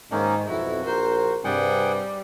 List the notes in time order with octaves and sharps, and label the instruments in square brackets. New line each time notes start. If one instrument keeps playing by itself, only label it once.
[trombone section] G#2 [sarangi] D#3 [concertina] A#3 C#4 D#4
[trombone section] B1 F2 [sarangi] E4 [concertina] F#4
[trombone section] A#1 A#4 [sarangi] C5
[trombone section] G2 C3 [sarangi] G3 [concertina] G#4 F#5 G5